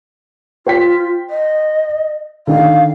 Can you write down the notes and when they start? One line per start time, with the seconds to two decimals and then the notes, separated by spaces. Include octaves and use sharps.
0.67 F4 C5 G5 B6
1.30 D#5
2.47 D3 D#3 D#4 F5